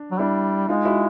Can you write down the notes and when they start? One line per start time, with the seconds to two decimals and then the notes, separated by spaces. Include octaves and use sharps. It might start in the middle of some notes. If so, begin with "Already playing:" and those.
Already playing: D4
0.11 F#3
0.19 G3 D4 E4
0.68 G#3 D#4 F4
0.85 E4 F#4